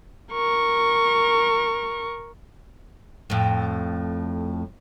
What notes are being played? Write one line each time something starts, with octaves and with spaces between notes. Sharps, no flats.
A#4 C#6
F2 A2